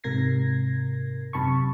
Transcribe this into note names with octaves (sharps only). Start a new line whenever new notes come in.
G#2 C3 A#4 G#6 A#6 C7
F#2 C3 A5 B5 C#6